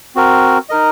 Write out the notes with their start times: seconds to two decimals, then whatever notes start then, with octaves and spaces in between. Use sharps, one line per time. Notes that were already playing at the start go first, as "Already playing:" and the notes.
0.15 C4 F#4 A#4
0.69 D#4 A#4 D#5